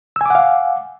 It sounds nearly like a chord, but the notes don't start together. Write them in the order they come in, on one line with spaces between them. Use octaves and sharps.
E6 G#5 D6 F#5 F5